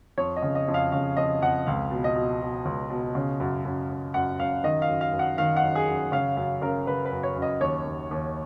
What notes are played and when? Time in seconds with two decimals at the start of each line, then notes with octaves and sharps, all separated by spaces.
0.18 F2 C#5
0.36 D#5
0.42 C#3
0.55 D#5
0.68 F2
0.74 F5
0.92 C#3 F5
1.17 F2 D#5
1.41 F2 F#5
1.66 C#2 F5
1.91 B2
2.04 D#5
2.16 B2
2.41 B2
2.65 C#2
2.90 B2
3.15 C#3
3.40 F#2
3.65 F#2
3.90 F#2
4.14 F#2 F#5
4.40 F#2 F5
4.64 D#3 D#5
4.82 F5
4.88 F#2
5.01 F5
5.13 F#2
5.19 F#5
5.38 D#3 F5
5.56 F#5
5.63 F#2
5.75 G#4
5.88 F#2
6.12 C#3 F5
6.37 F#2 F5
6.62 C#3 A#4
6.87 C#3 B4
7.05 B4
7.12 F#2
7.23 C#5
7.36 F#2
7.42 D#5
7.61 D#2 C#5
7.85 D#2
8.11 D#2